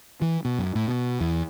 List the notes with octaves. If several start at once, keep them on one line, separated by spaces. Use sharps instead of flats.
E3
B2
F#2
A2
B2
E2